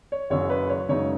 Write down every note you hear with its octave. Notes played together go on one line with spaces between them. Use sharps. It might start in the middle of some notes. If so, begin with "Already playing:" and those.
C#5
F#1 F#2 C#3 C#5
B4
C#5
F#2 C#3 G#3 D#4 C#5